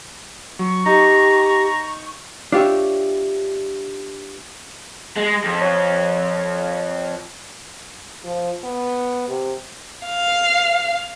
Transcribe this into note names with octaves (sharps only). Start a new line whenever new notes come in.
F#3 C#6
D#4 G4 A#5
D4 F4 G4 C#5 E5
G#3
F2
C#5
F3
B3
C3
F5